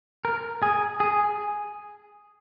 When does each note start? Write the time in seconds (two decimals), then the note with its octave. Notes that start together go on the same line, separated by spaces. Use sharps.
0.25 A#4
0.63 G#4
1.00 G#4